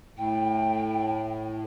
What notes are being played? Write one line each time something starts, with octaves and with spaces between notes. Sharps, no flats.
A2 G5